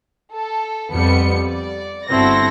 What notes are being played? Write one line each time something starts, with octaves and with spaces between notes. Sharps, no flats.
A4
F2 G3 B3 C#7
D5
G1 C4 E4 F#4 A4 A#6